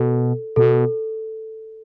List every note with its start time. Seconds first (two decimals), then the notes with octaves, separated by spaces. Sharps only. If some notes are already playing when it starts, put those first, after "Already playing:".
Already playing: B2 A4
0.56 B2 A4